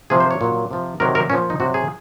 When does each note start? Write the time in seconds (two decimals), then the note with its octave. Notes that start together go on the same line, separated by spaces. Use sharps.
0.10 C3 F3 G#4
0.20 C5
0.31 C#5
0.41 A#2 F#3
0.71 C3 F3
1.00 C3 D#3 F#3 A#4
1.15 A#4
1.30 A#2 F3 C#4
1.50 D#4
1.60 C3 F#4
1.63 F#3
1.74 G#4